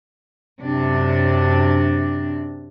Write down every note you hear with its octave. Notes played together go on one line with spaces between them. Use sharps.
F#2 C3 D4